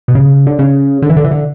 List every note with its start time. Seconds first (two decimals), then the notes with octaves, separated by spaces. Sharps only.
0.08 B2
0.15 C#3
0.47 D3
0.59 C#3
1.02 D3
1.10 E3
1.17 D3
1.24 E3
1.31 D3